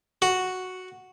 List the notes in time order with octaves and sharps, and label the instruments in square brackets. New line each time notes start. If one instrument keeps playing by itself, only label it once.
[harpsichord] F#4